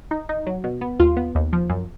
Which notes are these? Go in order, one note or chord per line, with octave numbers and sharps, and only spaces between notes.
D#4
D#4
F#3
B2
B3
D#2 F4
B3
D#2
F3
F#2